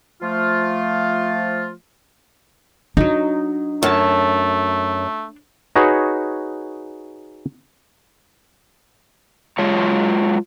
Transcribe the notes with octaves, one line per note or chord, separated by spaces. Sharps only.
F3 A3 F4
F#3 D4 D#4
F#2 A3 C#5 A5
D#4 F#4 G#4 B4 C#5
F#3 G#3 F4 C#5 A5